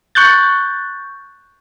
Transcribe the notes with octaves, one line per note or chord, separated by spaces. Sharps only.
C#6 F#6 G6 A6